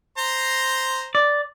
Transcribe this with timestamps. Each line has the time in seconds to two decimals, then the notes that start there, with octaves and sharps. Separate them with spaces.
0.18 C5 A#5 C6
1.15 D5